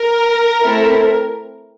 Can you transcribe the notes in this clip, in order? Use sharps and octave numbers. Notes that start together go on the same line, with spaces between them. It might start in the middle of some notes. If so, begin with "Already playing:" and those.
Already playing: A#4
A3 C4 E4 A4